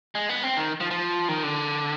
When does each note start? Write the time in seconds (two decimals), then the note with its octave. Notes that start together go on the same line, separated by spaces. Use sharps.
0.15 G#3
0.29 B3
0.43 C4
0.57 D#3
0.81 F3
0.91 F3
1.29 D#3
1.43 D3